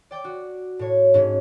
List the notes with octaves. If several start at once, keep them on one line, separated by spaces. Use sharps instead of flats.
D5 G5 D6
F#4
A2 C#5
G#2 C#4